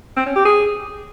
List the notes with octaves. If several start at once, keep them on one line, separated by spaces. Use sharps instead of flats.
C4
C#4
G4
G#4